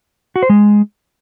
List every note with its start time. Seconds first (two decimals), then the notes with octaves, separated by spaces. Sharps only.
0.36 F#4
0.43 C5
0.50 G#3